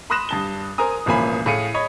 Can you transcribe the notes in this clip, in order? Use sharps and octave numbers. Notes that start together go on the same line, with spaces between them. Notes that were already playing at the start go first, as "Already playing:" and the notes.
B5 C6 D#6 F#6 A#6 E7
G2 A5 G7
A#4 C5 G#5 A#5 D#6
E1 A1 F3 A#3 G#5 B5
A2 G#4 F5 C#7 D#7
C#5 D#5 B5